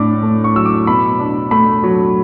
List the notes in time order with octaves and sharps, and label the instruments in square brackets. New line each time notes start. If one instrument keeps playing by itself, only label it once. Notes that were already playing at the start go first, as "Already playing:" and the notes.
Already playing: [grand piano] A2 D4 D6
A3
C#6
F#3 E6
D6
B2 B5
D4
A3 B5
F#3